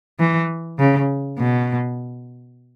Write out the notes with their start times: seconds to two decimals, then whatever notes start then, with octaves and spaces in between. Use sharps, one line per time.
0.20 E3
0.79 C#3
1.39 B2